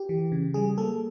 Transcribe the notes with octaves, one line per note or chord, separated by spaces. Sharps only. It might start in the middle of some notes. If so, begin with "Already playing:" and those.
Already playing: G4
E3
C#3
G3 G#4
A#3 A4